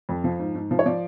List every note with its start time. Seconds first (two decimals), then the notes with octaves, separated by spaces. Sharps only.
0.09 F2
0.24 F3
0.39 G#2
0.55 G#2
0.71 F3
0.79 C#5
0.86 F3 D5